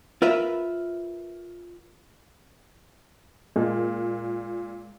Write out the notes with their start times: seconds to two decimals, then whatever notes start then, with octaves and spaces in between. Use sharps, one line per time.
0.22 F4 A#4 B4 E5
3.56 A#2 G#3